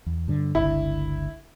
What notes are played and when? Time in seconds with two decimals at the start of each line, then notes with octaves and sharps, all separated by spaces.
0.06 E2
0.28 G2 D3
0.55 G1 C#2 D3 E4